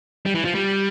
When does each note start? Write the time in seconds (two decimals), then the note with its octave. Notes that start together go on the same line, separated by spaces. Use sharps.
0.26 G3
0.35 E3
0.45 F3
0.55 G3